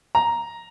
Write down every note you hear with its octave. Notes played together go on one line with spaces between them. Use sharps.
A#5